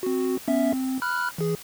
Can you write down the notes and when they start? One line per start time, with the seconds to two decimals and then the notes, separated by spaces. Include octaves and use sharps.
0.03 C4 F#4
0.48 B3 C#4 E5
0.73 C4
1.02 B5 F6 F#6
1.38 E3 G#4